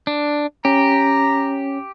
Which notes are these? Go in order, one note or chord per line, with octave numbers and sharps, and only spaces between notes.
D4
C#4 G4 A#5